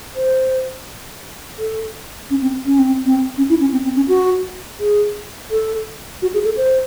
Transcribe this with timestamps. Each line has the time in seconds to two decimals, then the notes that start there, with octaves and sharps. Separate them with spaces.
0.16 C5
1.59 A4
2.30 C#4
2.42 C4
2.66 C#4
2.79 C4
3.05 C4
3.37 C#4
3.49 E4
3.61 C#4
3.72 C4
3.84 C4
3.96 C#4
4.08 F#4
4.80 G#4
5.51 A4
6.22 F#4
6.34 G#4
6.45 A4
6.57 C5